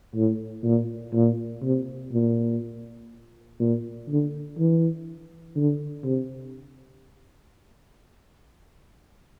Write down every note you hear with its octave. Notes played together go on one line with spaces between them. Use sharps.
A2
A#2
A#2
C3
A#2
A#2
D3
E3
D3
C3